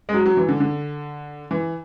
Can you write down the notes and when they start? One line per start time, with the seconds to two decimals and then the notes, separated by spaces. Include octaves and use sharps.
0.09 G#3
0.14 F#3
0.26 F#3
0.37 E3
0.48 D3
0.60 D3
1.51 E3